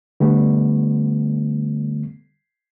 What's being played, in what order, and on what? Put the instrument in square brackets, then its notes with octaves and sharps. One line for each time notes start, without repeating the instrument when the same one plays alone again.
[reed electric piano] D3 G3 A3 B3